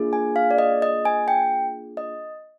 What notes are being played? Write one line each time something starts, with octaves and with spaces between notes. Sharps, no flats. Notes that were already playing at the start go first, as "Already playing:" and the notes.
Already playing: A#3 D4 F4 G#4
G#5
F5
D5
D#5
D#5
G#5
G5
D#5